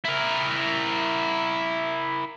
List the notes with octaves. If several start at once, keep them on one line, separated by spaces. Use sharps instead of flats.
E4 A#4